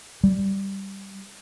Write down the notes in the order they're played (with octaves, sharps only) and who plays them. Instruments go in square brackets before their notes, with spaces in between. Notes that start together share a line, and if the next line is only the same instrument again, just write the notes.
[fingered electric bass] G3